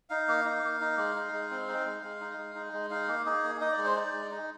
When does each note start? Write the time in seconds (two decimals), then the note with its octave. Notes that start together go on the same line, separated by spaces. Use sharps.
0.10 D#4 F5
0.28 A#3
0.44 D#4
0.63 A#3
0.81 D#4
0.97 G#3
1.16 D#4
1.33 G#3
1.51 C4
1.68 D#4
1.85 G#3
2.03 G#3
2.21 D#4
2.38 G#3
2.55 D#4
2.73 G#3
2.90 D#4 F5
3.08 A#3
3.26 D#4 G#4
3.44 A#3
3.61 D#4 D#5
3.72 D5
3.78 G#3
3.84 C5
3.96 D#4 D5
4.13 G#3
4.31 D#4